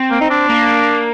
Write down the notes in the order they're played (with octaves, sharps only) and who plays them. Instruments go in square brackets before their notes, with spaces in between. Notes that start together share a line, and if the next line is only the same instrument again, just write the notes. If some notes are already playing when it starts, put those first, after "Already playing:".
Already playing: [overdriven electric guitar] C4
[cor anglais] A#3
D#4
D4
[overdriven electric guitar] A#3